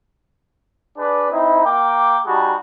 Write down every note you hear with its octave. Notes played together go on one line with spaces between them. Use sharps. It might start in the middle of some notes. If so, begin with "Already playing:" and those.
D4 G#4 B4 D5
C4 D#4 E4
A#3 G5 D6
G3 D#4 F#4 G#4 A5 B5